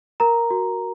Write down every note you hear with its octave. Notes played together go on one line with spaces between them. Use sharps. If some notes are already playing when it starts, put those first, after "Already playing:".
A#4 A#5
F#4